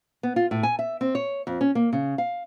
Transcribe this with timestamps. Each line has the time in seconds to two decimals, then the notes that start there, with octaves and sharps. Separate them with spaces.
0.23 B3
0.36 F4
0.51 A2
0.63 G#5
0.79 E5
1.01 C4
1.15 C#5
1.47 F2
1.61 C#4
1.75 A#3
1.93 C#3
2.18 F5